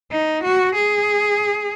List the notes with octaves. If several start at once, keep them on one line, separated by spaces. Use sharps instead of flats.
D#4
F#4
G#4